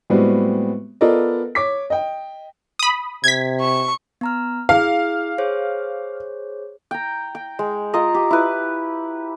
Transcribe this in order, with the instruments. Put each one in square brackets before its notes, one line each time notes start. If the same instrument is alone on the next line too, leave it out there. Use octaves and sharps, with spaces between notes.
[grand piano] A2 G3 G#3 B3 C4 F#4
B3 F4 A4 A#4 D5 D#5
C#5 D6 B6
D#5 G5
[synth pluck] B5 D#6
[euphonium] C3 [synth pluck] G#6 B6
[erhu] C#6
[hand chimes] B3 A#5 F6
[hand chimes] E4 G#4 [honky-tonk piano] F5
[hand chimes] G#4 C5 C#5
[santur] G5 A#5
G5
G#3
F4 A#4 D#5 A#5
G4
E4 B4